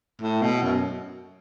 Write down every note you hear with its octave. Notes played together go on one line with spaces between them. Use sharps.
A2
B2
F#2